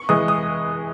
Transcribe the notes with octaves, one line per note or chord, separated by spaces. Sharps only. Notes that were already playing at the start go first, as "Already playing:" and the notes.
Already playing: C#6
E3 G#3 D#6
D#6